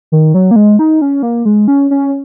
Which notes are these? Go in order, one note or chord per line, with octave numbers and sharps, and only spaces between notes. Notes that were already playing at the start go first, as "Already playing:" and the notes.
D#3
F#3
A#3
G#3
D#4
C#4
A#3
G#3
C#4
C#4